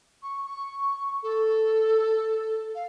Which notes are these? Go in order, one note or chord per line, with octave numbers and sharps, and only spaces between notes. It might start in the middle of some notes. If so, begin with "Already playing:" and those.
C#6
C#6
A4
F5